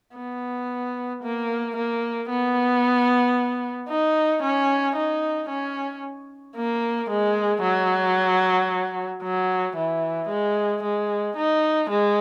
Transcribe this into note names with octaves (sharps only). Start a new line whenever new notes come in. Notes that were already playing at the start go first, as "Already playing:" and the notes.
B3
A#3
A#3
B3
D#4
C#4
D#4
C#4
A#3
G#3
F#3
F#3
E3
G#3
G#3
D#4
G#3